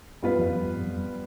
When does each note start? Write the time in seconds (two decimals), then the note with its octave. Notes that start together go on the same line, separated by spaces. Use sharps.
0.22 G2 G3 B3 F4 B4
0.39 F2
0.55 F2
0.76 G2
0.86 F2